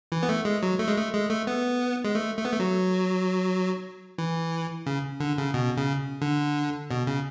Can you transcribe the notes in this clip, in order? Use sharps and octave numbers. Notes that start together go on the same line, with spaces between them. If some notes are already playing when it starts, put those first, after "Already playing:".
E3
B3
A3
G#3
F#3
A3
G#3
A3
G#3
A3
B3
G#3
A3
A3
B3
A3
F#3
E3
C#3
D3
C#3
B2
C#3
D3
B2
C#3